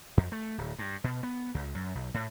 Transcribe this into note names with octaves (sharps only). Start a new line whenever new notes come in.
F2
A3
D1
G2
B2
B3
C#2
F#2
B1
A2